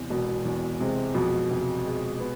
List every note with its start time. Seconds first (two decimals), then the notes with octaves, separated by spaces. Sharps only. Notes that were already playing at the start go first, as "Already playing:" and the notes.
Already playing: E2 C3
0.10 E1 B2
0.45 E2
0.80 C3 G#3
1.14 F2 B2
1.51 C3
1.85 G#3
2.20 B3